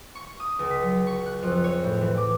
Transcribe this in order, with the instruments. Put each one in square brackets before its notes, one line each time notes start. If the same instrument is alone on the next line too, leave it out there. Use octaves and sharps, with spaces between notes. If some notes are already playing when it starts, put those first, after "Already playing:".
[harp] C#6
D#6
C#2
B6
F#3
C#6
F#6
F2
C#5
A2
E3
D6